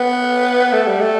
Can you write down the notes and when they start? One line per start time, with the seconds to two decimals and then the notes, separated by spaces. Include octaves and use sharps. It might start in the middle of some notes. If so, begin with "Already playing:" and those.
Already playing: B3
0.73 A3
0.87 G3
1.01 A3